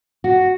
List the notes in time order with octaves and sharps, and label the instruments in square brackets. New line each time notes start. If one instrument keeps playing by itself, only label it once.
[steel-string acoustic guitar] F#4